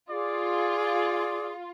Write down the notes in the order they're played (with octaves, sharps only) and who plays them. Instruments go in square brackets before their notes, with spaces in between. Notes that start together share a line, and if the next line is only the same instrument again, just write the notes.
[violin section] F4 [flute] G#4 [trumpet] D5